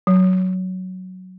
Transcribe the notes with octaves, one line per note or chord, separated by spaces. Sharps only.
F#3